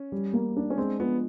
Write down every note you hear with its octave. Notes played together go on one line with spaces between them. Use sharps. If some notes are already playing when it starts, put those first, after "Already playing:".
Already playing: C#4
G3
A#3
D4
C#4
G#3 C4
F3 B3